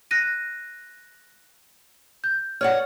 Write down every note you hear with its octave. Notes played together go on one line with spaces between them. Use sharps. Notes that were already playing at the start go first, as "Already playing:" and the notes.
F#6 A#6 D#7
G6
C#5 D5 F#5 F6